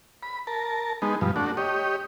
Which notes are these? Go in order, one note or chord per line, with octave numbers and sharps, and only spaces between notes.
B5
A#4 A5
G#3 B3 D#4
G2 B2 F3
A3 D4 F#4
G4 C#5 D#5